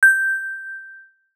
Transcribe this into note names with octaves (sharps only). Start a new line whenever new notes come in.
G6